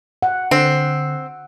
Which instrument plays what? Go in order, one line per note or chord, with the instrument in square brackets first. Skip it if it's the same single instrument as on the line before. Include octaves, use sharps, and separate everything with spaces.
[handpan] F#5
[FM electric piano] D3 [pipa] C4